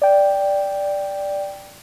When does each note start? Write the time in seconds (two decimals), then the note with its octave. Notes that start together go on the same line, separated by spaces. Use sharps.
0.02 D5 G5